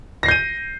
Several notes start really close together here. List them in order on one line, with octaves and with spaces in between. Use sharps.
A#6 C7 G6 D#7